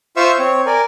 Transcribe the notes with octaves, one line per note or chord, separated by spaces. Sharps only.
F4 C5 E5 F5 C#6 E6
C4 C#5
A#4 D5 G#5